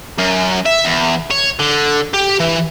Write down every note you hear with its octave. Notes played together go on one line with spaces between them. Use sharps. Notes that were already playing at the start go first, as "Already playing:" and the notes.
F#2
E5
E2
C#5
D3
G4
E3